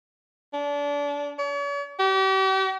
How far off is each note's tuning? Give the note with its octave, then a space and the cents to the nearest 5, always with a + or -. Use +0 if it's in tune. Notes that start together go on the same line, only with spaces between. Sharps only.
D4 -30
C#5 +45
G4 -40